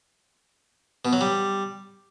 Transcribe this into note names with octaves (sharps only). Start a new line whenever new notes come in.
B2
F#3
G3